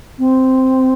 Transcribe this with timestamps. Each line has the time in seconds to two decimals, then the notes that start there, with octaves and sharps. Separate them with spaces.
0.19 C4